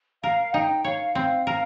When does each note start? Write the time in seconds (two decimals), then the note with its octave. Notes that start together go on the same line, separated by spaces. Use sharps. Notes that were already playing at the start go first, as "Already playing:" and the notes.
0.23 A#4 F5
0.53 D#4 G5
0.84 C#5 F5
1.15 C4 F5
1.46 A#4 F5